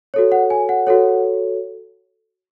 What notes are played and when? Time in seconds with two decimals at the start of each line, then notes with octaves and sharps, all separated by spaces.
0.14 F#4 A4 C#5
0.32 F#5
0.50 G#5
0.69 F#5
0.87 F#4 A4 C#5